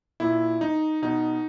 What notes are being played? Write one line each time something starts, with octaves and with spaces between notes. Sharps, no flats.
A#2 E4
D#4
B2 D#4